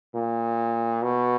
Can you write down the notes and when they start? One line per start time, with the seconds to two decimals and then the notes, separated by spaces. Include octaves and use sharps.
0.14 A#2
1.02 B2